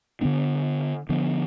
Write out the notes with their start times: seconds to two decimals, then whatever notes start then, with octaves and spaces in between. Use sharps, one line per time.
0.21 D3 F3 B3 D4
1.09 D3 F3 B3 D4